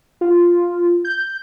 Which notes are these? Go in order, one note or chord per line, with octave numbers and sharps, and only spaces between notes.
F4
G6